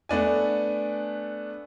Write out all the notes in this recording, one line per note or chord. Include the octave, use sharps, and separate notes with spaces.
A3 B3 D4 G#5